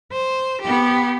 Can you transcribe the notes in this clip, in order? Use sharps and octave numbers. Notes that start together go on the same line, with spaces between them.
C5
B3 G4